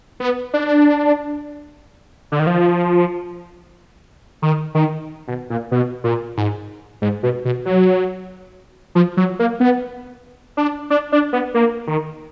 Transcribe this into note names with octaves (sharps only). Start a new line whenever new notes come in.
B3
D4
D3
D#3
F3
D#3
D#3
B2
A#2
B2
A#2
G#2
G#2
B2
B2
F#3
F3
F#3
A#3
B3
D4
D4
D4
B3
A#3
D#3